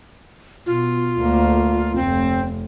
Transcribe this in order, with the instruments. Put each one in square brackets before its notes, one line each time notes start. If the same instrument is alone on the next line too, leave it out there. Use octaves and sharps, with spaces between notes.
[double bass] B2 [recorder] F4
[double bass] D2 A#3
[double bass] F1 [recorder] C4